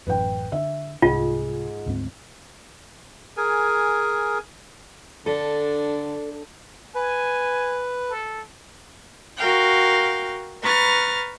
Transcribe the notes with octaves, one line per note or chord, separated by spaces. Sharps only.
A1 F#2 B4 G5
D3 E5
C2 G#2 F4 G#4
D2 G#2 C4
G#4 A#4 G#5
D3 D4 A4
B4 G#5
A4
F#4 A#4 F5 G5
B4 A#5 C#6 F6 A6